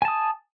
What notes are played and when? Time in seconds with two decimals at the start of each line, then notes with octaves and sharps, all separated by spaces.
0.02 G#5
0.05 A5
0.08 D#6